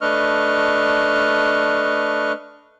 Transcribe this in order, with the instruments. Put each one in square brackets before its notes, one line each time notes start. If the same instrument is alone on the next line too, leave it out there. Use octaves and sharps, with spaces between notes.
[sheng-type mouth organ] A3 D4 B4 D#5 C#6 F6